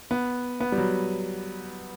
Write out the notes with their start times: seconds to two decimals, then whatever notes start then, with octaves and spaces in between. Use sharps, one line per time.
0.11 B3
0.60 B3
0.72 G3
0.78 F#3